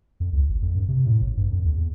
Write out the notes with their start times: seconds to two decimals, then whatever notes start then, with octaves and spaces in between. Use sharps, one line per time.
0.20 F2
0.33 C#2
0.49 G#1
0.62 F2
0.75 G2
0.88 C3
1.06 A2
1.21 A1
1.37 G2
1.51 F2
1.65 D#2
1.78 E2